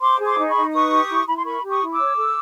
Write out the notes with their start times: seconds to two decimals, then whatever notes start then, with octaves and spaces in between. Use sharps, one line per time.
0.01 C5 C6 D6
0.19 G#4
0.25 C6 D6
0.37 D#4
0.49 B5 C#6
0.55 D#4
0.72 B4 C#6 D#6
0.90 G4
1.09 E4
1.27 E4 B5
1.36 C6
1.44 A#4 B5 C#6
1.63 G4
1.68 C#6 D#6
1.80 E4
1.93 D6 E6
1.99 C#5
2.17 A4